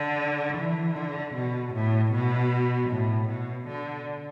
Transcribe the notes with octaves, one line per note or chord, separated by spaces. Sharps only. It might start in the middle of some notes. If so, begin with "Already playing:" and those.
Already playing: D3
E3
D3
B2
A2
B2
A2
B2
D3